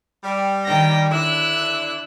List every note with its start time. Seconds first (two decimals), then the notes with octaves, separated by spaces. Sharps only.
0.24 G3
0.65 D#3 G5 A#6
1.10 D3 D4 E4 E6 F#6